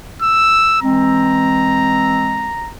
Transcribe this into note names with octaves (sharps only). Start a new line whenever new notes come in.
E6
E3 G#3 C4 A#5